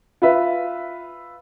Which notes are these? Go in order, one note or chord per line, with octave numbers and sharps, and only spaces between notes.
F4 B4 E5